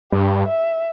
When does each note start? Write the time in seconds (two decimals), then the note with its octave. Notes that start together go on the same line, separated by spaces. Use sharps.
0.12 G2 G4
0.47 E5